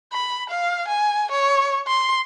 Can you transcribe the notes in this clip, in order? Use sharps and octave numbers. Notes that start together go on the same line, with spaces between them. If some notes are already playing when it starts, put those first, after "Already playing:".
B5
F5
G#5
C#5
C6